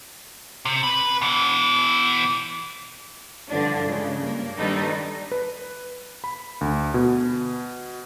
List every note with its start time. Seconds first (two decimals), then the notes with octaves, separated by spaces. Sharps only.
0.65 C3
0.83 B4 B5
1.22 B2 E3
3.49 G2 D3 E3 F3 D4 F4
3.84 C#3 G#3
4.20 G2 A#3
4.57 D#3 G3 D4 D#4 A4 B4
5.31 B4
6.24 B5
6.61 D2
6.94 B2